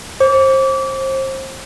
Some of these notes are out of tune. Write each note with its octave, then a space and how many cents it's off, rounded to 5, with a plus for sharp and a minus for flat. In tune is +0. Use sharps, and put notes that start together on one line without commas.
C5 +30 D6 -30